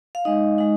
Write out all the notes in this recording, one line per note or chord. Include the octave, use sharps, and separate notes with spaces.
F5
G#3 D#4 D#5
G#3 D#4